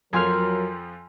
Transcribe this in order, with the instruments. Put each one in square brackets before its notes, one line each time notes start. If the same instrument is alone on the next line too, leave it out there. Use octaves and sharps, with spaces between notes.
[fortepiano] F2 F3 [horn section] F#3 [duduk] A#4 [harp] G#5 C6 F6